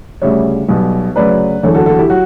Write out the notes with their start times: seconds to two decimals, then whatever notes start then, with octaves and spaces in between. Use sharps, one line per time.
0.22 D2 C#3 G3 C#5 E5
0.69 B1 B2 G3
1.16 D2 C#3 F#3 B4 D5
1.63 F#1 E2 D3 A4 C#5
1.74 F#4 A4
1.86 F#4 A4
1.99 E4 G4
2.10 F#3 F#4